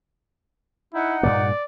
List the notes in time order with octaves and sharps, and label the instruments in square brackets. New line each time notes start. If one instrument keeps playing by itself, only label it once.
[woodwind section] D#4 F#5 [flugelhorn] E4
[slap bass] G2 A#2 A#3 [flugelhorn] D5